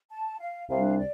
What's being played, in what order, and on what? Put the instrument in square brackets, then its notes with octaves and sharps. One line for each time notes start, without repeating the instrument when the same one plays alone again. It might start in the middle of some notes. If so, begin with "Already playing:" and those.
[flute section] A5
F5
[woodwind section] C2 C3 G3 D4 [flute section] F5
[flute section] D5